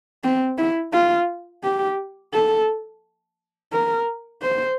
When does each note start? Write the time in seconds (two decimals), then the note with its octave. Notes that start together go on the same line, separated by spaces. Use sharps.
0.24 C4
0.58 E4
0.93 F4
1.64 G4
2.34 A4
3.73 A#4
4.42 C5